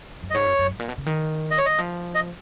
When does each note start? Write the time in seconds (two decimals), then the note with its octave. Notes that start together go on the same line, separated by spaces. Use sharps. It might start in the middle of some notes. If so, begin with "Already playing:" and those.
0.23 F#2
0.30 D#5
0.34 G#2 C#5
0.46 F#2
0.59 F#2
0.70 G#2
0.80 A#2
0.89 B2
0.98 C#3
1.06 D#3
1.51 D#5
1.58 C#5
1.66 D#3 D#5
1.79 F3
2.15 D#5